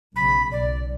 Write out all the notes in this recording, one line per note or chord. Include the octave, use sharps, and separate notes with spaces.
B1 C#3 B5
B1 D5